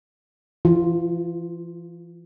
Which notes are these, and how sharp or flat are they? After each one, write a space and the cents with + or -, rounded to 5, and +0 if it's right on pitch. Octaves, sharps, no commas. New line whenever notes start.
E3 +40 F4 +0